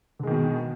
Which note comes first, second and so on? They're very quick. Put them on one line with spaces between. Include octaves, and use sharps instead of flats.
D3 G#3 D#3 B2